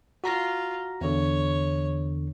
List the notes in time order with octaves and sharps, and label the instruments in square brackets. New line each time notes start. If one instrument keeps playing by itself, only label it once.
[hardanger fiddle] F4 [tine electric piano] F#4 A#5 A#6
[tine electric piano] E2 D3 [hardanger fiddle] C#5